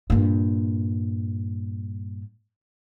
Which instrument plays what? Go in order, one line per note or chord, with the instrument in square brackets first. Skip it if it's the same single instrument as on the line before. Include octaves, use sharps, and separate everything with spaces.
[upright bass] G2 A#2